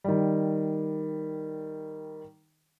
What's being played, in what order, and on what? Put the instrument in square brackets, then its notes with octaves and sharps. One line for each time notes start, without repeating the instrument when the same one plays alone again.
[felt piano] D#3 G3